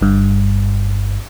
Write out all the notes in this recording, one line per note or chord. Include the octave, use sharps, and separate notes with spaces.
G1 G2